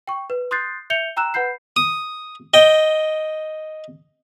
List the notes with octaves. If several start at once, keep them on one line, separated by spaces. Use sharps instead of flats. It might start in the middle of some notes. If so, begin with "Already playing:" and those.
G5 C#6
B4
C6 D#6 F#6 G6 A6 C7
E5 G6 C#7 F7 G7
G5 A#5 E6 F#6 E7
B4 F#5 B5 G6 C7
D#6
D#5 G5